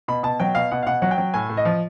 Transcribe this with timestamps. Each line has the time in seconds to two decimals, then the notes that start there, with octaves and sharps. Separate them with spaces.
0.08 B2 B5
0.23 B2 A5
0.40 F#3 G5
0.55 B2 F5
0.71 B2 F#5
0.83 F5
0.87 B2 F#5
1.02 F#3 F#5
1.11 G5
1.18 F#3
1.34 A2 G#5
1.50 A2
1.57 D#5
1.65 F3